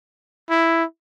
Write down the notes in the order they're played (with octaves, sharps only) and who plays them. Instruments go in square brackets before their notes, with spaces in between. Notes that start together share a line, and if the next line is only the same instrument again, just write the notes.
[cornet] E4